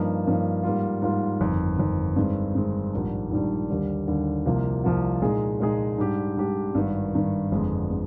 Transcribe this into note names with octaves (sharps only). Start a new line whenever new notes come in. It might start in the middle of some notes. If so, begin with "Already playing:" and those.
Already playing: G2 F3 A#3 D#4
G2 F3 A#3 D#4
G#2 G3 A#3 F4
G#2 G3 A#3 F4
G1 F2 D#3
G1 F2 D#3
G2 D#3 G#3 C4
G2 D#3 G#3 C4
A#1 G#2 D#3 G3 D4
A#1 G#2 D#3 G3 D4
D#2 D3 G3
D#2 D3 G3
C2 C3 F3 A#3 F4
C2 C3 F3 A#3 F4
A#2 G#3 D#4 G#4
A#2 G#3 D#4 G#4
G#2 G3 D4 G4
G#2 G3 D4 G4
G#1 G2 D#3
G#1 G2 D#3
G1 F2 D3 G#3
D3 G#3